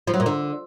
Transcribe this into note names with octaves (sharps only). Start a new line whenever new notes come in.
F3
F#3
A#2
D3